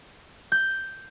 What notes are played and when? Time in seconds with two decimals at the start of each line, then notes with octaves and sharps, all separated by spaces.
0.52 G6